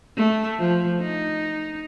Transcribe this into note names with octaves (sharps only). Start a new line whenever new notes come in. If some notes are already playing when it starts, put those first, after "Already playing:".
A3
F3
D#4